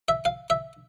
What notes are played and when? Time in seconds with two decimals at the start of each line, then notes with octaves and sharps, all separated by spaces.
0.08 E5
0.25 F5
0.50 E5